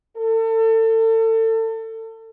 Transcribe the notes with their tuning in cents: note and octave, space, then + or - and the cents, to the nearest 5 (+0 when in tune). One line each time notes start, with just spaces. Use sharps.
A4 +30